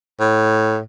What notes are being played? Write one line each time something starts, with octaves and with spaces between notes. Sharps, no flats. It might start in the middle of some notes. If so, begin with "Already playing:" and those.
A2